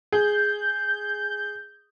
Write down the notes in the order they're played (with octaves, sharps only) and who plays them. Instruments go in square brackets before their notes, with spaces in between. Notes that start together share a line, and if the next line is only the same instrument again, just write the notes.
[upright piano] G#4 [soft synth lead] G6